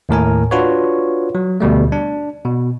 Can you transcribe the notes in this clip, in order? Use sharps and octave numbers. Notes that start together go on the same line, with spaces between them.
D#2 A2 A#4 G#5
D4 F4 F#4 B4 C#5
F#3
D2 B2 G3 A3
D4
B2